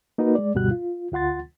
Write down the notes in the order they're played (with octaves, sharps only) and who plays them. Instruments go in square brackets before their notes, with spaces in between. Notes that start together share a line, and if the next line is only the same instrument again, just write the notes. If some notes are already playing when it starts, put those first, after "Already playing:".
[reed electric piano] A#3 D#4 F#4 A#4 B4
G#3 D5
D2 G2 B2 G3 F#4 F#6
F4
D2 F4 F#5 C6 A6